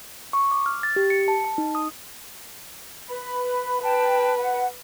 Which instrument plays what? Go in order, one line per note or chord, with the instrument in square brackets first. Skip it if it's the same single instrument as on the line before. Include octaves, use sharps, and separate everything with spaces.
[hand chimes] C#6
D6
F6
A6
G4
C#7
A5
A5
D#4
D#6
[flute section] B4 B5
[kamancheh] B4 [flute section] G5 A5
[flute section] F#5